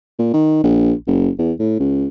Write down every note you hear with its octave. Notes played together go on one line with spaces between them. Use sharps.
A#2
D#3
A#1
F#1
E2
A2
C#2